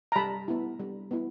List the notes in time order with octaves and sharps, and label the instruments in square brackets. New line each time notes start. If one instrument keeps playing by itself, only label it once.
[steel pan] A#5
G3 A5 B5
B3 E4
G3
B3 E4